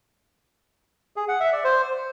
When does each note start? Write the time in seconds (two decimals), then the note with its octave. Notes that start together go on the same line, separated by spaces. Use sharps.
1.16 G#4
1.28 F#5
1.40 E5
1.52 D5
1.64 C5